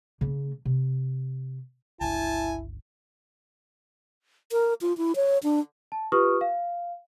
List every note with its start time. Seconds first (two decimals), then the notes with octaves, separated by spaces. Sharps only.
0.21 C#3 A#3
0.65 C3
2.01 G1 C#2 E4 G#5 A5
4.52 A#4
4.81 F4
4.98 E4
5.16 C#5
5.43 D4
5.92 A5
6.12 F4 G4 B4 C#6 D#6 F6
6.41 F5